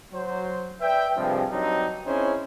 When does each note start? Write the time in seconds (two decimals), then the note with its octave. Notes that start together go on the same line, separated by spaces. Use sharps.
0.13 F#3 C5
0.81 B4 D5 E5 G5
1.16 G2 C3 F3 G3 G#3
1.50 G2 F#3 C4 D4 D#4
2.05 C4 C#4 D#4 E4 G#4 C5